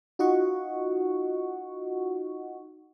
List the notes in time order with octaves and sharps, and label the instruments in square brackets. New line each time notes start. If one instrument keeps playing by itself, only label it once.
[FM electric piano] D#4 F4 F#4 D#5 F#5 C#6